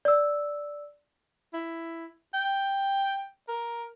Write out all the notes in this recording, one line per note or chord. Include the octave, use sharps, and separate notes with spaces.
D5 E6
E4
G5
A#4